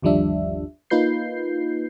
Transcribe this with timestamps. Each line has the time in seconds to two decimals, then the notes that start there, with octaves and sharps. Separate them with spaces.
0.02 G1 D#2 F3 G3 D4 E5
0.90 A#3 D#4 F4 B4 G6 C7